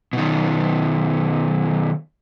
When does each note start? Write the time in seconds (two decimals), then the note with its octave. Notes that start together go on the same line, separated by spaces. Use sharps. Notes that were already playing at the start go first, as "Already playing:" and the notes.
0.13 B2 D#3